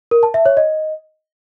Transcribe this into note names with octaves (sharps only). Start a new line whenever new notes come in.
A#4
A5
E5
C#5
D#5